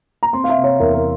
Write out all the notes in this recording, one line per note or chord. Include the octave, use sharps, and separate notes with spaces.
A#5
C4 C6
F5
E5
C3
C#5
E2 A#4
A#4